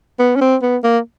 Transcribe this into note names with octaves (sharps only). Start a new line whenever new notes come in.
B3
C#4
C4
B3
A#3